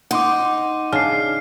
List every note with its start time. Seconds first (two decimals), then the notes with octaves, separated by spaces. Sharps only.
0.11 D#4 F#5 C6 D6
0.92 C#3 D4 F6 C7